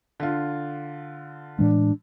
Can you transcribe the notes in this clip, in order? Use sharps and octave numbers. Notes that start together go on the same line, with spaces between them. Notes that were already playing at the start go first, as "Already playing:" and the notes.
D3 F4
A2 E3 G#3 D4